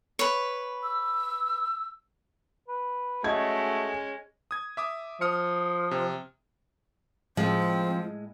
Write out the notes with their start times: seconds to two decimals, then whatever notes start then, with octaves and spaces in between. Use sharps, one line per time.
0.19 B4 C#5
0.83 E6
2.68 B4
3.24 G#3 A3 C#4 F#4 D#5 G#6
4.51 D#6 G#6
4.77 E5 D6 D#6
5.21 F3 D#6 F6 C#7
5.91 C3
7.37 A2 F3 G#3 C4